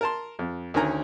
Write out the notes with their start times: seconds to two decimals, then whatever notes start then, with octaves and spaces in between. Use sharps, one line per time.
0.01 A#4 A5 C6
0.39 F2
0.74 D2 D#3 C#4 A#4 G#5 A#5